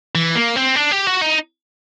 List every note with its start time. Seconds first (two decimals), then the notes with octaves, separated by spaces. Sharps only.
0.15 E3
0.35 A#3
0.56 C4
0.76 D4
0.91 G4
1.06 F#4
1.21 D#4